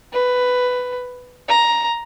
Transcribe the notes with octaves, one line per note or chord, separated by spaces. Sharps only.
B4
A#5